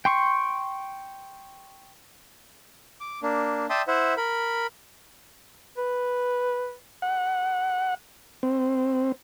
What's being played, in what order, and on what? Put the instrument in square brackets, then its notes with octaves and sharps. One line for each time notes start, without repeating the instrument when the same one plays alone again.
[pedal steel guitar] G5 C6 C#6
[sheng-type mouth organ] D6
A#3 D4
D5 E5 G5 A5 C6 D#6
E4 C5 E5 F#5
A#4 B5
[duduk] B4
[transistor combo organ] F#5
C4